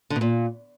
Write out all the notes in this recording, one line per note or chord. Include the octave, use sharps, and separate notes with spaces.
D3
B2
A#2